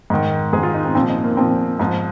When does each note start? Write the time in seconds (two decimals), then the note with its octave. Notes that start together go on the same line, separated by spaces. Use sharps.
0.10 G#2 D#3
0.53 G#2 D#3 G#4
0.63 F4
0.74 D#4
0.85 C4
0.95 A#2 F3 C4
1.09 D#4
1.24 A#3
1.37 A#2 F3 C4
1.80 G#2 F3